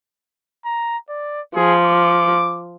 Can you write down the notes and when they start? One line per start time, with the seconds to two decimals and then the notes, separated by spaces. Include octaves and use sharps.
0.65 A#5
1.09 D5
1.56 F3 G#4
1.87 D6